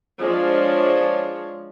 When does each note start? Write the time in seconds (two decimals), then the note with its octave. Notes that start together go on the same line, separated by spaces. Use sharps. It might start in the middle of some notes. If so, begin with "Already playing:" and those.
0.20 F3 G#3 D4 C#5